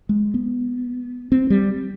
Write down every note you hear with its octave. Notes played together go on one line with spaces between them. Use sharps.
G#3
B3
C4
G3